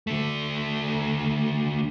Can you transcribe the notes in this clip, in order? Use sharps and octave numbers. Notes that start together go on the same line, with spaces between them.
D3 A3